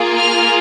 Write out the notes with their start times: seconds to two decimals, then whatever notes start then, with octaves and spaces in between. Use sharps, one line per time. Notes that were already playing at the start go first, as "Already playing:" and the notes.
Already playing: A#3 F4 G#4
0.17 F6